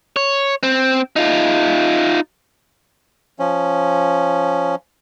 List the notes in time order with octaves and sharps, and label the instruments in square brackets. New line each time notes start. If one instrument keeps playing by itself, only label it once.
[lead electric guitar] C#5
C4
D#4 F4
[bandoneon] F3 C#4